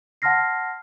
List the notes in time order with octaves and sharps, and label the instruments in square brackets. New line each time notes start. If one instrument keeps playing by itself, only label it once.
[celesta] F#5 A5 C6 F6 A#6 C7